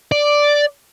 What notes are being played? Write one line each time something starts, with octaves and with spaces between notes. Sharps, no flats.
D5